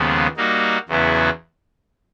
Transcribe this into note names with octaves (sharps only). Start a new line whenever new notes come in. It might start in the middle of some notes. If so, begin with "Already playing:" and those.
Already playing: D#2 C#3 F3 G#3 B3
G3 A#3 D#4 F#4
E2 C#3 F#3 B3 E4